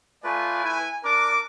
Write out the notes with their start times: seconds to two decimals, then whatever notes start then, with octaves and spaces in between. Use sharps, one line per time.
0.24 A3 F4 B4 D5 G#5
0.65 E4 G#5
1.04 D4 A#4 D6